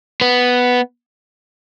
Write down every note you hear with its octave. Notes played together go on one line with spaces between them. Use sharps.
B3